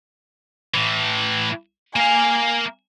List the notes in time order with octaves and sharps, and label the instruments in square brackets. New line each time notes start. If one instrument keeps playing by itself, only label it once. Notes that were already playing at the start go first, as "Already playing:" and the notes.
[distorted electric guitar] A2 E3
[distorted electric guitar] A#3 F5 [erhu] G#5